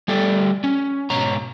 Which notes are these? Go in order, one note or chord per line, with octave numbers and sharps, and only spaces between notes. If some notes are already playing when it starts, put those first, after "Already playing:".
G3 A3 G4 A4 D5
C#4
G#2 B2 C#5 A#5